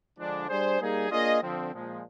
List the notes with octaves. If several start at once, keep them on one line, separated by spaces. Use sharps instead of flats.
D3 F3 G#3 D4
G3 D4 G#4 C5
G3 A#3 D#4 G#4
A#3 D4 F4 G#4 D#5
D3 F3 C4
A#2 F3 G#3